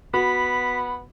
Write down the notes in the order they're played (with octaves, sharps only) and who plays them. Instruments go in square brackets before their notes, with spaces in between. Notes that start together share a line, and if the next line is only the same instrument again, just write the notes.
[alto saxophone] B3 [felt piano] F#4 [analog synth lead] B5 [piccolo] B6